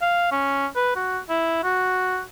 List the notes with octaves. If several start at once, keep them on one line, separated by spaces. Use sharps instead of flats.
F5
C#4
B4
F#4
E4
F#4